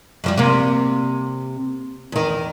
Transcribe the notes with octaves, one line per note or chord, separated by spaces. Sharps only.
F#2 F3 G3
C3 A#3
E2 D#3